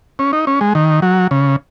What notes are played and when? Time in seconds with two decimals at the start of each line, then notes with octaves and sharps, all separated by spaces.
0.19 C#4
0.33 D#4
0.47 C#4
0.61 G#3
0.75 D#3
1.02 F#3
1.31 C#3